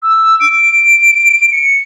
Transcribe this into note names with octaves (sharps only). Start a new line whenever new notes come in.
E6
D7
D7
C#7